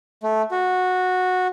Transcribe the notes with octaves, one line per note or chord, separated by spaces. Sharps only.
A3
F#4